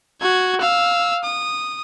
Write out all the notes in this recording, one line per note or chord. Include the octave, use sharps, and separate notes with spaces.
F#4 G#6
F5 E6
D#6